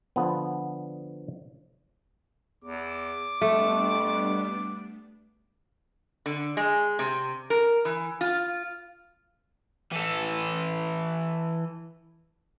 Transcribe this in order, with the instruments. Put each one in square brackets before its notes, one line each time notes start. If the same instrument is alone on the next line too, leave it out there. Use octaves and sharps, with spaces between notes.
[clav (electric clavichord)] D3 F3 B3
[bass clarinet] E2 [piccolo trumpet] D6
[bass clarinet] F2 [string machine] G3 B3 D4 [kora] A3
[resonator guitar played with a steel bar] D3
G#3
C3
A#4
E3
F4
[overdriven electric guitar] E3 A4